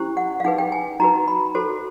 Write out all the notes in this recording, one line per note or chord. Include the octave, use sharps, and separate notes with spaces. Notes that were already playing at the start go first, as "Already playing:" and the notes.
Already playing: C#4 E4 G4 C5
F#5
F5
D#4 G#4 B4 F#5
G5
G#5
D#4 F#4 B4 A#5
B5
F#4 A4 C5